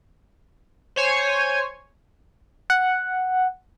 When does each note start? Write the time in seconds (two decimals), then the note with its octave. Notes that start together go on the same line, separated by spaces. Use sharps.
0.96 C5 C#5 G#5
2.70 F#5